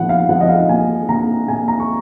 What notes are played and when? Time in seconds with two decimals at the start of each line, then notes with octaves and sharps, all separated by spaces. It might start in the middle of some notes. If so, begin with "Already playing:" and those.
Already playing: A#2 F3 B3 F#5
0.09 F5
0.29 F3 F#5
0.41 D#5
0.49 F5
0.69 A#2 G#5
1.09 A#2 A#5
1.48 A#2 G#5
1.68 A#5
1.80 C#6